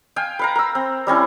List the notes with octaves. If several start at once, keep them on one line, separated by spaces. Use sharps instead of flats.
F5 G5 G#5
B4 F5 A#5
A#4 E6
C4
G3 C4 C#4 E4